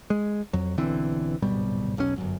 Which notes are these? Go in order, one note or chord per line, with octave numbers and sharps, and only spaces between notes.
G#3
F2 F#3
B1 D3 E3 C4
D1 G#1 B2 G3
E1 B1 A2 C#4
G1 F#2